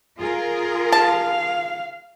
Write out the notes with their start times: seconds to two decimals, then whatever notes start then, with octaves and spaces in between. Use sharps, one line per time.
0.19 F4 G#4 A#4
0.92 F5 A5